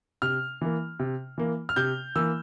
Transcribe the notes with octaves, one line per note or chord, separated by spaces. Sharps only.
C3 F6
E3 A#3
C3
E3 A#3
F6
C3 G6
E3 A#3 E6